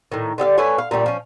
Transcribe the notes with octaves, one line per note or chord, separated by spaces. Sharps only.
A2 D#3
D3 G4 E5 F5
A3 B4 C#5 G#5
F5
A#2 D3 G3 A3
F3 C#4